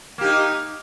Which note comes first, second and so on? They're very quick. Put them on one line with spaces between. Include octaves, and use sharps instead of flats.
A#3 G4 D#4